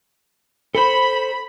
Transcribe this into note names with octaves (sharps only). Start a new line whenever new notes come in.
A4 C5 B5